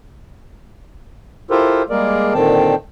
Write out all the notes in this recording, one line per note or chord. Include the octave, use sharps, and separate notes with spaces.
E4 F4 G4 A4 A#4 C5
G3 G#3 A#3 G#4 A#4 D5
A#2 D3 D#3 C4 G5 A5